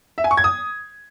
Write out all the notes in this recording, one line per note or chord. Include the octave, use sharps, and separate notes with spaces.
E5
G#5
C#6
G#6
D#6